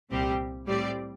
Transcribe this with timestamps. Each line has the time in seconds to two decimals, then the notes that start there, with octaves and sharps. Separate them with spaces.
0.10 C2 A#2 G3 C4 G4
0.67 A2 G3 C4 G4 D5